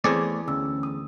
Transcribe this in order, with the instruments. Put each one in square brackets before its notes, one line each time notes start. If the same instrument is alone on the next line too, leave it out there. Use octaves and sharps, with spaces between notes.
[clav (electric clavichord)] E2 G#4 D5 [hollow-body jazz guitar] A3 C4 C#5
[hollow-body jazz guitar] D2 [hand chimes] C#4 E6
[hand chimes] D#6